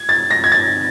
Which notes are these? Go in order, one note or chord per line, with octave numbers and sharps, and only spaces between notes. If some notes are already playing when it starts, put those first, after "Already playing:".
Already playing: G#6
A6
A#6
G#6
A6